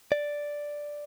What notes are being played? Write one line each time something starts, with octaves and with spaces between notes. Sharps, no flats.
D5